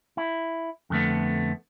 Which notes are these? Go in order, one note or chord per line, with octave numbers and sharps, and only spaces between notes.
E4
F2 D3 A3 B3